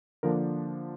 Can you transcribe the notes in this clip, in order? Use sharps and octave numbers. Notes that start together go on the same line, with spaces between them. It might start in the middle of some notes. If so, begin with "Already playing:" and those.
D3 F3 A#3 D4 A#4